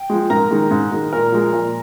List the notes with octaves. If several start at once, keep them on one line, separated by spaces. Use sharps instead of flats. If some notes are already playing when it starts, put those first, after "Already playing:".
Already playing: G5
F3 G#3
G#2 A#4 A#5
D#3 G#3
G#2
D#3 G#3
A#2 A#4 A#5
F3 G#3
A#2